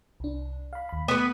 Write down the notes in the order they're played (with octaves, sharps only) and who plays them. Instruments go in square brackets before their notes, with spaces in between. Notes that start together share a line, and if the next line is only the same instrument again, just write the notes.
[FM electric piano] C2 D4
F5 B5
D#2 B5
[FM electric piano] A3 [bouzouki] B3 B4